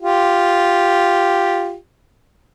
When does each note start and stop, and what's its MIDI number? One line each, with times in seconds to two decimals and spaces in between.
0.01 1.75 65
0.01 1.75 67